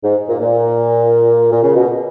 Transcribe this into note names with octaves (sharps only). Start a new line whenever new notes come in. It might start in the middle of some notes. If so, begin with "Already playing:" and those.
G#2
A#2
A#2
A#2
C#3
B2